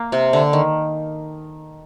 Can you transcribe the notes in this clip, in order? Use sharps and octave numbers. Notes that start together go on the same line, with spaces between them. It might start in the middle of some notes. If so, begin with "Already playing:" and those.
Already playing: A#3
C3
D3
D#3